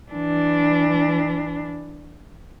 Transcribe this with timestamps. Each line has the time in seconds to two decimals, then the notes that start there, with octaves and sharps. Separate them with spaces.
0.12 E3 D4